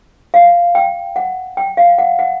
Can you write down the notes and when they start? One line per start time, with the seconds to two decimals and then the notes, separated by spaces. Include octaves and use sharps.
0.34 F5
0.75 G5
1.16 F#5
1.57 G5
1.77 F5
1.98 F#5
2.19 F#5